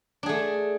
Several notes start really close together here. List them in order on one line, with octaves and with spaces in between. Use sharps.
D4 G#4 A3